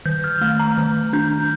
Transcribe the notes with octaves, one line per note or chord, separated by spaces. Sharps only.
D#3 G6
F6
A3 F6
A#5
D#3
D4 G6